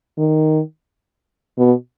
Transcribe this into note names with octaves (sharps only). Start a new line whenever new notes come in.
D#3
B2